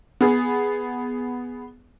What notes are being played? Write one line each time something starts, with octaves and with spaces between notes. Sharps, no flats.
B3 G#4